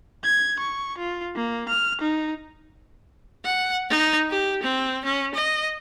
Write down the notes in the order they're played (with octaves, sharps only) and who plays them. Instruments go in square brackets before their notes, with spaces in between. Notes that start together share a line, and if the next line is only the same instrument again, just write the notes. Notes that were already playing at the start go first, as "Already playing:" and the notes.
[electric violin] G#6
C#6
F4
A#3
F6
D#4
[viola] F#5
D#4
G4
C4
C#4
D#5